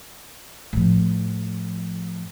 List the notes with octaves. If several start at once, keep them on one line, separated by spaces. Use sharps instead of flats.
A2 F3